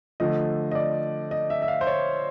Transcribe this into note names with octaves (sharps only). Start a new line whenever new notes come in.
D3 F3 A3 D#5
D#5
D5
D#5
E5
E5
F5
C5
C#5